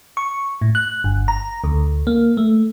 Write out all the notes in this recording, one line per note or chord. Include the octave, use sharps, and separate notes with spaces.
C#6
A2
F#6
G1
A#5
D2
A#3
A3